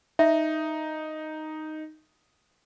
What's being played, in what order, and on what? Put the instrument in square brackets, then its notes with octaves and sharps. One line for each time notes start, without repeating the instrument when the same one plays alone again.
[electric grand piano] D#4 [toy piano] E5